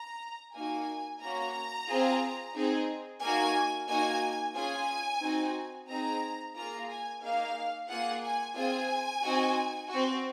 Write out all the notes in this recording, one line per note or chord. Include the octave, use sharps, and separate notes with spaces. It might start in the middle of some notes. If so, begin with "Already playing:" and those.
Already playing: A#5
A#3 D#4 F#4 G#5
A#3 C#4 F#4 A#5
C4 F4 G#4
C4 D#4 G#4
A#3 D#4 F#4 G#5
A#3 D#4 F#4 G#5
C#4 F4 G#4 G#5
C4 D#4 F#4
C4 D#4 G#4 A#5
A#3 F4 G#4 A#5
G#5
A#3 D#4 G#4 F5
A#3 F4 G#4 F#5
G#5
C4 F4 G#4 G#5
C4 D#4 F#4
F#4
C4